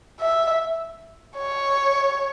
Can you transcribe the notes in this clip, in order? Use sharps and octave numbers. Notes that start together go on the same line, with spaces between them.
E5
C#5